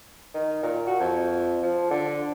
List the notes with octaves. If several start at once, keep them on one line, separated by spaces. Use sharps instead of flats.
D#3
A#2
F#4
F2
F3
D3